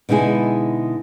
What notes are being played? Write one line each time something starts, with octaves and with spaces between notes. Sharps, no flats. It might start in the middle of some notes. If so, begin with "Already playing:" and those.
B2 D3 G#3 D#4 E4 G#4